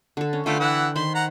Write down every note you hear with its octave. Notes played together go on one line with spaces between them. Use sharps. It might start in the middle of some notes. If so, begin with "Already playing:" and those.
D3 A4
C#4
D3 A3 F4 B4 G5
E3 F#5 E6
D#3 C5 B5 C6
F#5 A#5